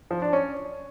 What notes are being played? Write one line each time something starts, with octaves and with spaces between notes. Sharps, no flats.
F3
D4
C#4